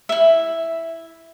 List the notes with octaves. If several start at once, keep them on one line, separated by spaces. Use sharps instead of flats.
E4 E5